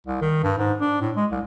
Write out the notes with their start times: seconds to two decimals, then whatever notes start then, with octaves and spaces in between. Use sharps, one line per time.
0.07 C2
0.21 D#3
0.43 G2
0.58 G#2
0.81 D4
1.01 A2
1.16 G#3
1.32 C2